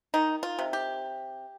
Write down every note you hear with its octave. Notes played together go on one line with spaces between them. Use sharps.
D#3 D#4
F4
C3
G4